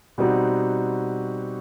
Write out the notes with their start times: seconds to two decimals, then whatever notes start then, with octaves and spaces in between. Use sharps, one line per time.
0.18 B2 G3 C4 D#4 F#4